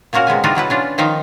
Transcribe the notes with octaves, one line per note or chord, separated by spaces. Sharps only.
A#2 A#3 C#4 F#4 A#4
C3 G#3 B3 G#5
E3 G3 D4 D#4 F4 F#4
B2 F#3 E4 B4
C#4 D4 F4
D#3 F3 D#4 E5 F5 G5